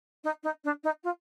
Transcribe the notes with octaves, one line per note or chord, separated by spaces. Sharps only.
D#4
D#4
D4
D#4
F4